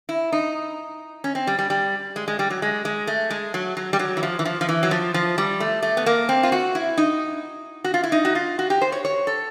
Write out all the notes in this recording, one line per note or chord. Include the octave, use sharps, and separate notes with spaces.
E4
D#4
C#4
C4
G3
G3
G3
G#3
G#3
G3
F#3
G#3
G#3
A3
G#3
F#3
F#3
G3
F#3
E3
F3
E3
F3
F3
E3
F#3
F3
F3
G3
A3
A3
B3
A#3
C4
F4
F#4
E4
D#4
F#4
F4
E4
D#4
F#4
F4
F#4
G4
C5
C#5
C#5
A4